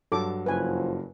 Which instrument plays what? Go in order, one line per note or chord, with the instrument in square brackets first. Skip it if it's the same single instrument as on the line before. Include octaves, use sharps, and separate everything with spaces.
[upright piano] G2 F#3 [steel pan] A4 D6
[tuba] F#1 [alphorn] F3 [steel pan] B4 G#5